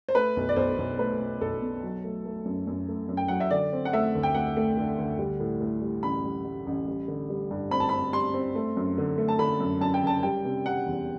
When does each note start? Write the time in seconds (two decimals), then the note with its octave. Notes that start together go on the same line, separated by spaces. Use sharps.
0.08 C5
0.15 A3 B4
0.37 B1
0.49 D5
0.56 B1 C5
0.78 B1
0.99 A3 B4
1.20 B2
1.41 B1 A4
1.61 B2
1.83 F#3
2.04 A3
2.25 A3
2.45 F#2
2.67 F#2
2.88 A3
3.09 F#2
3.17 G5
3.28 F#3 F#5
3.40 E5
3.51 D3 D5
3.73 C4
3.85 F#5
3.93 A3 E5
4.15 D2
4.23 G5
4.34 A3 F#5
4.57 A3
4.77 D3
4.98 D2
5.19 G3
5.40 A2
5.61 A2
5.82 G3
6.03 A1 B5
6.24 G3
6.45 G3
6.67 A1
6.87 G3
7.08 D3
7.30 G3
7.51 G2
7.71 C4 B5
7.80 A5
7.89 C4 B5
8.13 G3 C6
8.34 C4
8.55 A3
8.77 F#2
8.98 D3
9.18 A3
9.28 A5
9.39 D3 B5
9.60 F#2
9.81 F#2 A5
9.94 G5
10.03 F#1 A5
10.23 G3 G5
10.45 C3
10.66 G3 F#5
10.86 E2